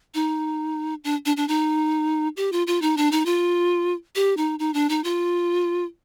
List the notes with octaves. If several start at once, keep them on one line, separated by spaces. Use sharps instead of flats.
D#4
D4
D4
D4
D#4
G4
F4
F4
D#4
D4
D#4
F4
G4
D#4
D#4
D4
D#4
F4